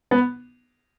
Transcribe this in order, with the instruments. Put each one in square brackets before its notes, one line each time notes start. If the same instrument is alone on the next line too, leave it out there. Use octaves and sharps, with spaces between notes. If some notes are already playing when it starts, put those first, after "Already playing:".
[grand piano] B3